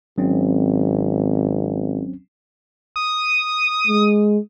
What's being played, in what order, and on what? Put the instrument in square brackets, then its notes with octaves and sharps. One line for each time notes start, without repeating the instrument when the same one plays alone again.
[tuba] G#1 [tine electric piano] F#3 C4 C#4
[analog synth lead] D#6
[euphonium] G#3